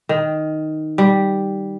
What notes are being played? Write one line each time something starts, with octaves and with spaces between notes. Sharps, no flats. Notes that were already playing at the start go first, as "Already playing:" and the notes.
D#3
G3